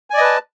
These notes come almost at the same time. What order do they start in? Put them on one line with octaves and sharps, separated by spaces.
G#5 D5 D#5 B4 A5